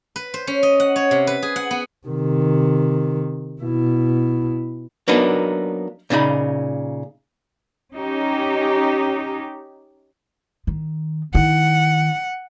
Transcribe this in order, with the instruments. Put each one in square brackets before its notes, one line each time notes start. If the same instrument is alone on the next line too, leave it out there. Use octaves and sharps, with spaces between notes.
[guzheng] B4
C5
C#4
D#5
F#5
C#5
C3
B4
G#4
F#5
B3
[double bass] C3 D#3
B2 E4
[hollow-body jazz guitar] F#3 A#3 B3 D4 D#4
A#2 C#3 D#4 B5
[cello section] C#4 D#4 G4
[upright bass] D#3
[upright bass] D#3 E4 [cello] F#5